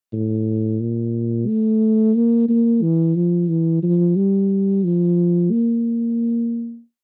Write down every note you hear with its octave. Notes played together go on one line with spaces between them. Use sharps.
A2
A#2
A3
A#3
A#3
E3
F3
E3
F3
G3
F3
A#3